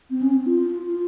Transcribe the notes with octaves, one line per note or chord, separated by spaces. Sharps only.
C4
C#4
C4
F4
F4